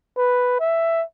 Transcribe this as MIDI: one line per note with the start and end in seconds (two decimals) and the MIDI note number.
0.17 0.59 71
0.60 1.03 76